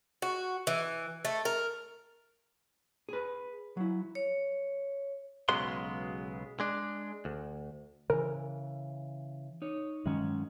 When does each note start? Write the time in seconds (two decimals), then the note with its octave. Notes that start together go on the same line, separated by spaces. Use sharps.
0.22 F#4
0.67 E3
1.25 A3
1.45 A#4
3.09 G#4 B4
3.77 F#3 E4
4.15 C#5
5.49 B1 C#3 F#3 G#3 B3 C6
6.60 G#3 D4
7.25 D2
8.10 C#3 E3 A#4
9.62 D#4 C#5
10.06 G2 D#3 F#3 G#3 C#4